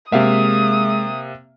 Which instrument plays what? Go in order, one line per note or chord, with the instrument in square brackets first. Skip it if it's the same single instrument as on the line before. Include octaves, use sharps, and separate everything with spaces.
[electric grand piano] C3 E5 [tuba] G#3 [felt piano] A#3 F5 [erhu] D#6